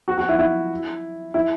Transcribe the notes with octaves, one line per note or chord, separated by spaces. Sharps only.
F#4
F#4
E4
E4
E4